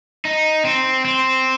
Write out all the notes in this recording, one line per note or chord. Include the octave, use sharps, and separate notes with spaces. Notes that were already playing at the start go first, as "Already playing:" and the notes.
D#4
C4
C4